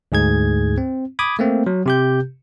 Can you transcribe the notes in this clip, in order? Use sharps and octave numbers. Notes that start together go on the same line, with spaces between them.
D2 G#2 G#4 G#6
C4
B5 D6 D#6 G#6
A3 A#3 C4
F#3
C3 G4 G6